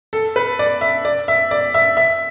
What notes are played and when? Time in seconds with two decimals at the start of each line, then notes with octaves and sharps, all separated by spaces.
0.13 A4
0.36 B4
0.59 D5
0.81 E5
1.05 D5
1.28 E5
1.51 D5
1.74 E5
1.97 E5